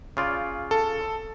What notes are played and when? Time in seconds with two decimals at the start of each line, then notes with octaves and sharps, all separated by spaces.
0.17 C#3 F4 D5
0.71 A4